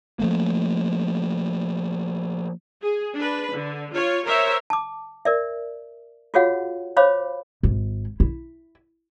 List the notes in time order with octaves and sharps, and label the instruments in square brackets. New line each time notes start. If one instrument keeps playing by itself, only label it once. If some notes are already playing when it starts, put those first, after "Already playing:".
[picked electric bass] F3 A3 A#3
[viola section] G#4
D4 B4
D3
F4 C#5
A#4 C5 C#5 E5
[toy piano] A5 D6
A#4 D5 E5
F4 F#4 G#4 C#5 F5 F#5
C5 C#5 F5 B5 D6
[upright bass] G#1
E4